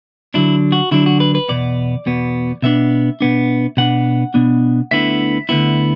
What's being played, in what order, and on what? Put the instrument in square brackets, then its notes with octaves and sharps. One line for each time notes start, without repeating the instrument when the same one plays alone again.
[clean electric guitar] D3 F#3 D4 E4
F#4
D3 F#3 D4 E4
F#4
B4
B4
E2 B2 B3 D5
E2 B2 B3
B2 B3 D4 E5
B2 B3 D4
B2 B3 D4 F#5
B2 B3 D4
D2 D3 B3 E4 E5
D2 D3 B3 E4